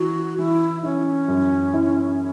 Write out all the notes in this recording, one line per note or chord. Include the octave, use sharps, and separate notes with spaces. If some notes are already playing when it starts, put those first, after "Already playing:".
Already playing: E3 F#4
E3 E4
C#4 E4
F#2
E4